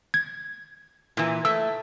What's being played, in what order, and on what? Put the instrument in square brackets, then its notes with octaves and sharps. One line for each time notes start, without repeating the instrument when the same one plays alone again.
[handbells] G#6
[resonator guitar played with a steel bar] A#2 E3
[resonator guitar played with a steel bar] A3 [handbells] E6